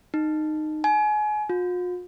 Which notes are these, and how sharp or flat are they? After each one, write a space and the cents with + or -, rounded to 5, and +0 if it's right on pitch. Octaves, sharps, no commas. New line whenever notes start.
D#4 -15
G#5 +30
F4 +45